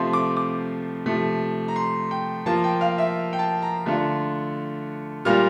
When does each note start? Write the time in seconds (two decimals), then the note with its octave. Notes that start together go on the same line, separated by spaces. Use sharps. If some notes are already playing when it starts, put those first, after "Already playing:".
Already playing: C3 F3 A3 C4 F4 C6
0.13 D6
0.37 D6
1.06 C3 F3 A3
1.68 A#5
1.76 C6
2.11 G5
2.46 F3 A#3 F4 A5
2.64 G5
2.81 F5
2.98 E5
3.33 G5
3.39 A5
3.62 A#5
3.85 D3 A3 D4 F4
5.25 A#2 G3 A#3 F4 F6